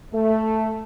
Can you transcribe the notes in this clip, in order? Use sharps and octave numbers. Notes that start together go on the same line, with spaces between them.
A3